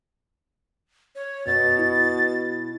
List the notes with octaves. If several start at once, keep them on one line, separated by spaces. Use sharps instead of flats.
C#5
F#2 B2 A6
E4